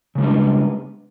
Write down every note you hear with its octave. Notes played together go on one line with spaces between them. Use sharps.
C#3 G3 G#3 B3 D4